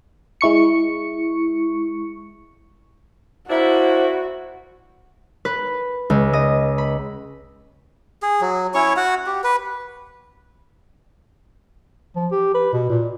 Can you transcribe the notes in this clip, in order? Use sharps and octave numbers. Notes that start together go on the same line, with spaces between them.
G#3 E4 C#6 C#7
A#3 D4 E4 F#4 C5
B4
C#2
D#5
B5
G#4
F#3
C#4 E4 C#5 C#6
F#4 F#5
G4
B4
F3
G4
B4
B2
A#2